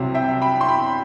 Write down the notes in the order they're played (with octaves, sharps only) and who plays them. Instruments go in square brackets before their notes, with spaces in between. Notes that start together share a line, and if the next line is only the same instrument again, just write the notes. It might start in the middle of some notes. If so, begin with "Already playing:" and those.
Already playing: [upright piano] C2 C3 F#3 C4
E5 G5
G5 B5
C6
G5 B5